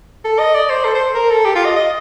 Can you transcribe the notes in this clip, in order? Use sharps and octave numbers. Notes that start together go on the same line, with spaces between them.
A4
D#5
D5
C5
A4
C5
A#4
A4
G4
F4
D#5
D#5